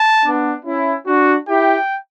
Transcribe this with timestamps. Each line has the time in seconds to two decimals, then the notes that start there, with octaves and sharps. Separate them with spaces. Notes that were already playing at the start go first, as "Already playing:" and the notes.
Already playing: A5
0.24 B3 D4
0.65 C#4 E4
1.06 D4 F#4
1.48 E4 G4 G5